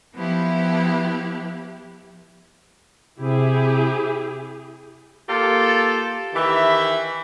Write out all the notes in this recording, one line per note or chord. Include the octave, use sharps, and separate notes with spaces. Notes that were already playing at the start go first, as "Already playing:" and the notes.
F3 B3 E4 G4
C3 E4 G4 G#4
A#3 F4 G4 A4
D#3 E3 G4 E5